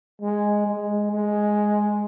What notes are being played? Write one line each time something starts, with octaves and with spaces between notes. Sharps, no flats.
G#3
G#3
G#3